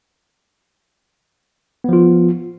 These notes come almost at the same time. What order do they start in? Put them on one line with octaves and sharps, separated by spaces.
B3 F3 F4